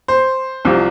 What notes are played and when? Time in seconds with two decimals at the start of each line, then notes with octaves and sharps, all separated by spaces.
0.08 C5
0.65 C2 C3 F3